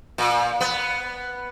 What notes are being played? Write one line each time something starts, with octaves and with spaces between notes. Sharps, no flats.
A#2
B3